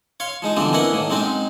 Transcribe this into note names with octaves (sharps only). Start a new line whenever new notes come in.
C#5 F5 C6
F3 G#3 D#4
D3 E3 F3 G3 B3 C4
A#3 B3 C#4 E4 D#5 F#5
A2 D#3 A#3
F#3 G#3 C4 C#4 D#4